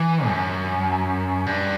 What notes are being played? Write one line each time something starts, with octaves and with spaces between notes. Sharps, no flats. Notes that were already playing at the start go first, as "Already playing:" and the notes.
Already playing: E3
F#2
G2